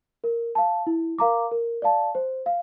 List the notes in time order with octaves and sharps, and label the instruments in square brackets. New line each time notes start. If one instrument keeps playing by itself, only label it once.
[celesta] A#4
F5 A5
E4
A#4 F5 A#5 D6
A#4
D5 F5 A5
C5
F5